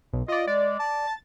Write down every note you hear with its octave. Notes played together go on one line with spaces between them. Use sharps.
B1
F4 D5 D#5
G#3 D5
A5
A6